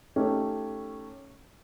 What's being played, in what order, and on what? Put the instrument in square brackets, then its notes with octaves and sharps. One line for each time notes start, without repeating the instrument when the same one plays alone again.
[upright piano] A3 C#4 D#4 G4